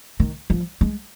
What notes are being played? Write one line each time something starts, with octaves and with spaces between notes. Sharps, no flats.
D#3
F3
G#3